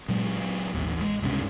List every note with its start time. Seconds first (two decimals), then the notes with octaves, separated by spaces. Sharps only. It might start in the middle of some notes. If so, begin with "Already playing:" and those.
0.08 A#2 F#3 G#3
0.74 A1 D#2
1.01 G#3
1.21 C#2 G2 C3 C#4